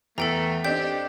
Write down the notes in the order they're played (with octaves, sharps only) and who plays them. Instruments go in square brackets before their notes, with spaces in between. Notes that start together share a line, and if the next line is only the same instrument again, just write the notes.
[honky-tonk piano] E2 [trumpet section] A3 [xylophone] A4 G5 A#5
[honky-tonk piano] C4 D4 D#4 [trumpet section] G4 [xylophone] G5 G6